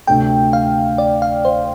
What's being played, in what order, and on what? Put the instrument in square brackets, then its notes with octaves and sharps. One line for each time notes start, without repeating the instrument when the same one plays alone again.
[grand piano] D2 C3 A3 D4 A4 [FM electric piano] G5
[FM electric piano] F5
D5
F5
C5